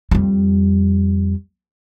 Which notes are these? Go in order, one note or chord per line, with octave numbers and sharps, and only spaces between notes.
F2 G3